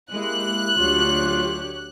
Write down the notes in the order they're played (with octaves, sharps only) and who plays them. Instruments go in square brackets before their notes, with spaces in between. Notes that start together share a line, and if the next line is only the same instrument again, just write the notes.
[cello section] G#3 [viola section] A#3 G4 [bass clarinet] E4 [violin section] F#6
[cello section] D2 D4 [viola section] F#3 G4 C#5 [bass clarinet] F4